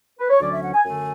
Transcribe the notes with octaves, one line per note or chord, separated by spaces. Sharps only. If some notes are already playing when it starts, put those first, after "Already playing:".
B4
C#5
D2 D3 F#3 C#4 D5
E5
F#5
G#5
F#2 D3 A3 G#5